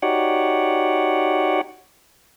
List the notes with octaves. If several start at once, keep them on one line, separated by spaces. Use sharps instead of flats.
D#4 F#4 G4 C#5 D5 F#5